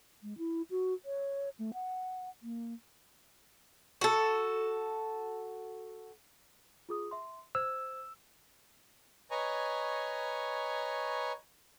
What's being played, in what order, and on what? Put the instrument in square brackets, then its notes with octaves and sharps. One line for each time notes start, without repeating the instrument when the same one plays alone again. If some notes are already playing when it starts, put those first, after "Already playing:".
[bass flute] G#3
E4
F#4
C#5
A3
F#5
A#3
[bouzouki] F#4 A4
[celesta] F4 G#4 D#6
E5 C6
[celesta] C5 G#6 [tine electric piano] E6
[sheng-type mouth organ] B4 C#5 D#5 G#5 A#5 C#6